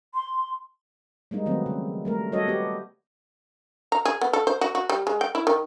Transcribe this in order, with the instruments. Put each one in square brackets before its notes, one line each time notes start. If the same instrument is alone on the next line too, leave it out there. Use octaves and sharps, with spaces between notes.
[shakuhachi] C6
[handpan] G3 G#3 A#3 D#4
D#3 F3 F#3 A3 B3 C4
C#3
G3 A3 A#4
G3 F#4 A4 C#5 D#5
B3 G4
[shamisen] A#5
G#4
B3
A4
C5
F#4
F#4
G3
G#3
G5
E4
D#3